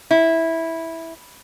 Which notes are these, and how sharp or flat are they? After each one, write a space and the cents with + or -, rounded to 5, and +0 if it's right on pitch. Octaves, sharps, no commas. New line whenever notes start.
E4 -10